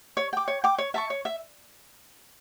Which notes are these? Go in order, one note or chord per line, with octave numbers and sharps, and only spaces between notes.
C#5
G5 D6
C#5
G5 D6
C#5
E5 A5 C#6
C#5
E5